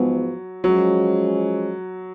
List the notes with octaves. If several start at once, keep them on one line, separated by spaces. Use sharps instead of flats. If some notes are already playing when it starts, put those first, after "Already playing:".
Already playing: G#2 F3 F#3 G#3 B3
F3 F#3 G#3 C#4